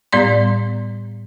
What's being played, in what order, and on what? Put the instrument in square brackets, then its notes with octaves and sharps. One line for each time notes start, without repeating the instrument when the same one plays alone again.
[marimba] A2 G3 B3 D5 C6